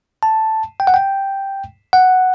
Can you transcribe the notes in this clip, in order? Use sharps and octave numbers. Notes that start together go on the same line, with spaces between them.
A5
G5
F#5
G5
F#5